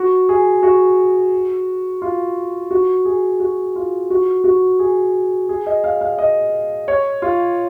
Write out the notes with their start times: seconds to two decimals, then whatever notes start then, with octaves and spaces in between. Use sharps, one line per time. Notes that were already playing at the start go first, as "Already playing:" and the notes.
Already playing: F#4
0.29 G#4
0.63 F#4
2.02 F4
2.71 F#4
3.05 G#4
3.40 F#4
3.76 F4
4.10 F#4
4.44 F#4
4.79 G#4
5.49 G#4
5.67 D#5
5.84 F5
6.01 F5
6.19 D#5
6.88 C#5
7.22 F4